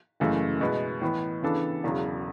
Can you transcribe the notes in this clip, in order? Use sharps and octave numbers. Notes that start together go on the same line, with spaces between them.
F#1 F#2 C#3 E3 A3
B2 G#3 B3 E4
A2 E3 B3
C#3 E3 B3 D4 A4
E1 E2 C#3 F#3